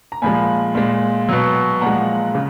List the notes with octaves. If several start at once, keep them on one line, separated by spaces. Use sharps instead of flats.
A#5
A#2 F3 G#3 G#5 B5
A#2 G#3
B2 F#3
A#2 F3 G#3 F#5 A#5
C#3